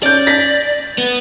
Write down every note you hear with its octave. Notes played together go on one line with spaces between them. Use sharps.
C#4 D5 G6
A#6 B6
B3